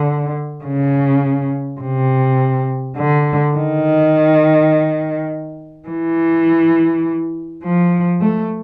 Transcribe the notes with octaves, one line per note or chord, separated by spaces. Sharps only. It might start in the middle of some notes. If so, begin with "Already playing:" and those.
Already playing: D3
C#3
C3
D3
D#3
E3
F3
A3